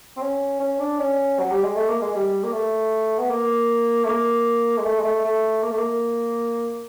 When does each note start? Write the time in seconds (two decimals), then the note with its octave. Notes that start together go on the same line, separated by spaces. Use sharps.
0.17 C4
0.22 C#4
0.60 C#4
0.80 D4
0.99 C#4
1.39 F#3
1.51 G3
1.64 G#3
1.76 A3
1.88 A#3
2.02 G#3
2.15 G3
2.44 A#3
2.53 A3
3.19 B3
3.30 A#3
4.04 A3
4.09 A#3
4.78 G#3
4.85 A3
4.99 G#3
5.04 A3
5.24 A3
5.63 A#3
5.71 A3
5.78 A#3